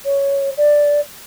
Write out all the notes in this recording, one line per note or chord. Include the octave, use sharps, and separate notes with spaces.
C#5
D5